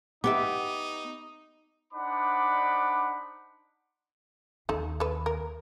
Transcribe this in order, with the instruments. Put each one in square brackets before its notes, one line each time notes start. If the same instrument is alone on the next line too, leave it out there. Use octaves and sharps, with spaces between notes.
[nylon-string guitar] B3 G4 E5 [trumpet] D#4 [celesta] D6
[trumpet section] D4 D#4 C5 F#5 B5 D6
[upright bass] D#2 [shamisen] D#4 A4
[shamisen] A4 B4
A#4